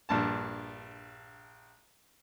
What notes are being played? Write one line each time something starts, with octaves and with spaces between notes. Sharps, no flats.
A#1 G2 A5